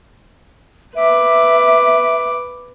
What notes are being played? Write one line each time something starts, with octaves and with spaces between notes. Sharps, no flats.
B4 E5 D6